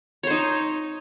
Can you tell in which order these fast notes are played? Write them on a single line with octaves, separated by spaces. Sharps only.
C#5 C5 D#4